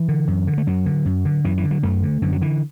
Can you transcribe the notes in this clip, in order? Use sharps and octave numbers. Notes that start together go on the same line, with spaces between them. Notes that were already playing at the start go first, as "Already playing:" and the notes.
Already playing: E3
D3
F#2
D3
A3
F#2 F#3
D3
F#2
D3
F#2 E3
E3
D3
F#3
F#2 A3
D3
F#2 D3
F#3
D3 E3